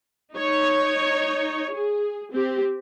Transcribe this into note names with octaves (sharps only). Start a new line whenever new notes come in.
D#4 C#5
G#4
C4 G4